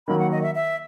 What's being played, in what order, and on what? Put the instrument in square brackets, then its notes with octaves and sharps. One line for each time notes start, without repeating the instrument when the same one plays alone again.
[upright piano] D#3 F#3 A#3 [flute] B5
[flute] F#5
D#5
E5
E5